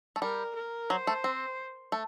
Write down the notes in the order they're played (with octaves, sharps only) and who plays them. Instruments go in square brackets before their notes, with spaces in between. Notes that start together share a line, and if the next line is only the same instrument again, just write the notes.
[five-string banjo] A3
[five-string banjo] G3 [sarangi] A#4
[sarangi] A#4
[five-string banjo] F#3 [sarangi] C5
[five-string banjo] A3
C4
A3